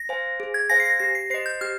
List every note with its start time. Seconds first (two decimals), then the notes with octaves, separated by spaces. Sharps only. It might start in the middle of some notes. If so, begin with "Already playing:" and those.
Already playing: A#6
0.09 C5 F5 G#5
0.40 G#4
0.54 G#6
0.70 C5 F5 G#5 A#6
0.80 C7
0.85 A#6
0.99 G4 A#6
1.15 C7
1.30 C5 D#5 C7
1.46 G6
1.61 G4 F6